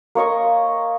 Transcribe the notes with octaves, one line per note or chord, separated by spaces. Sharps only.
A#3 C#5 D#5 C#6